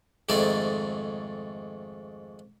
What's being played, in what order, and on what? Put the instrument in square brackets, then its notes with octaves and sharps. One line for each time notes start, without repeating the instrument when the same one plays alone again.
[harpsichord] F2 G#2 D#3 A3 D5